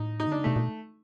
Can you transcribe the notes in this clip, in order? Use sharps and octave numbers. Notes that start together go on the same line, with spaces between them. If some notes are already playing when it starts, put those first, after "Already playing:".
Already playing: A2 D#4
D#4
D3 D4
C#3
C3 A3
B2